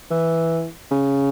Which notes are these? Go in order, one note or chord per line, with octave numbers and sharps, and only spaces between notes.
E3
C#3